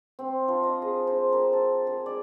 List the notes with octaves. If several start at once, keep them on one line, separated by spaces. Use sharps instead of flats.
C4
F3
D#5
G#4
C5
A#4
A4
G#4
D5